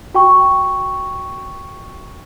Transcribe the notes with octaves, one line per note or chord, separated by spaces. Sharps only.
F#4 G5 C#6